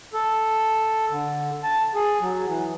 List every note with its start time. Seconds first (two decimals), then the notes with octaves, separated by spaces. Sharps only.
0.14 A4
1.10 D3
1.64 A5
1.94 G#4
2.21 F#3
2.47 E3